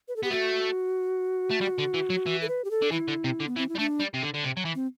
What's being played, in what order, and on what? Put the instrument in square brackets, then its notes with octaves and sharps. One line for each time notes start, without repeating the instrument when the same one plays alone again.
[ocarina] B4
A4
[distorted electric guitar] B3 [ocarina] G4
[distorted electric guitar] A3 [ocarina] F#4
[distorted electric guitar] A3
G3
D3
E3
F#3
E3
[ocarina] A4
B4
G4
A4
[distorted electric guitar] D3
[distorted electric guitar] E3 [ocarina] E4
[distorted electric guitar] D3
C3
D3
[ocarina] B3
[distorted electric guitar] E3 [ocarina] C4
[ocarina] E4
[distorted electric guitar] G3
[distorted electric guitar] A3 [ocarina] D4
[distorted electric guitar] G3
C3
D3
D3
C3
F#3
E3
[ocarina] C4